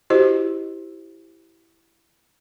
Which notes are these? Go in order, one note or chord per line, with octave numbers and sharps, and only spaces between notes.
E4 F#4 G4 C5 D#5